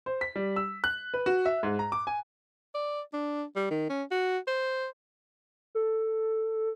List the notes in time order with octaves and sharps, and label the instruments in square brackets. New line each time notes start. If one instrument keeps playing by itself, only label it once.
[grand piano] C5
B6
G3
E6
F#6
B4
F#4
E5
G#2
A#5
D6
G#5
[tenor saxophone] D5
D4
G3
D#3
C#4
F#4
C5
[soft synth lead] A4